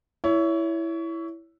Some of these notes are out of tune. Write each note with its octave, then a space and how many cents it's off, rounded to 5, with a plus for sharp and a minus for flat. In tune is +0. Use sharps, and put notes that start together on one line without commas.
E4 +5 C#5 +25